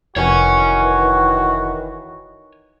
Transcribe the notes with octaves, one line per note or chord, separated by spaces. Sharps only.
F1 D#3 E3 F#4 C#5 G#5